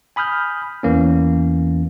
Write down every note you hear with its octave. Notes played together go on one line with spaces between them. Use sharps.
G#5 B5 D#6 F6 G6
E2 E3 A#3 C#4